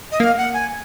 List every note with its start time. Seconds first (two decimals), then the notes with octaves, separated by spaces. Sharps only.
0.12 D#5
0.20 A#3 F5
0.38 F#5
0.54 G#5